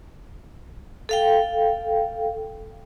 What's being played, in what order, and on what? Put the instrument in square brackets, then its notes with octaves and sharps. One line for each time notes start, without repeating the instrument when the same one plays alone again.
[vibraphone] A4 F5 G5